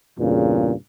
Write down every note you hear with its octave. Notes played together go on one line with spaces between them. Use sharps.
E2 G2 A#2 C#3